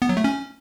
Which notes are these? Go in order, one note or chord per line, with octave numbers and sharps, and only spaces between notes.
B3
F#3
A3
C#4